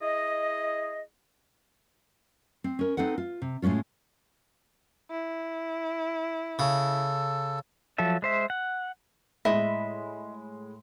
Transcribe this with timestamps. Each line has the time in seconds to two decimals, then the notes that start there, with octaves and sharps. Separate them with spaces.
0.02 E4 G#4 D#5
2.64 C4
2.79 C#4 A#4
2.97 C4 D#4 A4 B4 F#5
3.18 F4
3.42 C3
3.62 A2 G#3 A3 C#4 F4
5.10 E4
6.59 C#3 A4
7.98 F3 F#3 A4 E5
8.22 G#3 C5 E5
8.50 F#5
9.45 A2 G#3 D#5 E5 B5